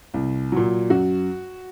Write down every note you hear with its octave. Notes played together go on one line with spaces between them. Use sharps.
C2
A#2 F#3
F#2 F#4